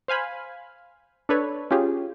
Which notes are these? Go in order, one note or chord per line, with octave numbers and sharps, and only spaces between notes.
C5 F5 G#5 B5
D4 A4 B4 C#5
C#4 F4 G4 G#4